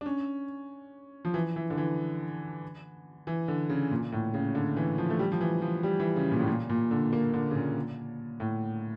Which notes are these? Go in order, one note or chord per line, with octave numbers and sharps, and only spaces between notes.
D4
C#4
F3
E3
E3
D3
E3
E3
D3
C#3
A#2
A2
C#3
D3
E3
F3
A3
G3
F3
E3
F3
G3
E3
C#3
A#2
A2
A#2
A#2
D3
A#3
D3
C#3
A#2
A2